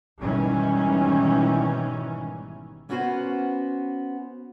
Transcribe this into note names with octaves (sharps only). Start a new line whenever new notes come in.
G#1 B2 D#3 E3 G3 C#4
A#3 B3 C#4 F#4 B4 C5